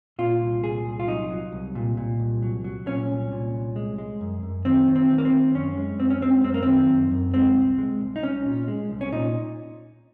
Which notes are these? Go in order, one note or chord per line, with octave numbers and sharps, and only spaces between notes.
A#2 F4
C2
A#2 G#4
C2
F4
F#3 D#4
F#3
C2
A#2
A#2
C2
F#3
F#3
A#2 C#4
C2
A#2
C2
G#3
G#3
F#2
F#2
D#3 C4
D#3
C4
D#3
A#3
C4
D#3
F#2 C#4
G#3
F#2 C4
C#4
G#3 C4
F#2 C4
A#3
D#3 C4
F#2
F#2
G#3 C4
C2
G#3
C2
D#4
C2 C#4
A#2
G#3
C2
C#4
A#2 D#4